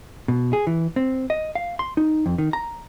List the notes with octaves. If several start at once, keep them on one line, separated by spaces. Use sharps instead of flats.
B2
G#4
E3
C4
D#5
F5
C6
D#4
F2
D#3
A#5